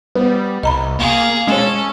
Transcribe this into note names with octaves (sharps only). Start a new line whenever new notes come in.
G3 B3
C2 D#5 A#5 B5
A#3 G#4 F5
G#3 C#4 A4 C#5